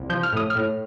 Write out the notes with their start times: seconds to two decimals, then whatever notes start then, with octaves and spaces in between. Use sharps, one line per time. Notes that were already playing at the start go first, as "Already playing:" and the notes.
Already playing: C2
0.10 F3 G6
0.23 F6
0.32 A2 D#6
0.50 F6
0.55 A2